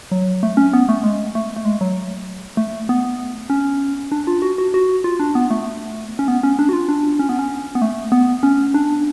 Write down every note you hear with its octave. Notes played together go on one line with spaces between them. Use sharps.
F#3
A3
C#4
B3
A3
G#3
A3
A3
G#3
F#3
A3
B3
C#4
D4
F4
F#4
F#4
F#4
F4
D4
B3
A3
C#4
B3
C#4
D4
F#4
F4
D4
C#4
B3
C#4
B3
A3
B3
C#4
D4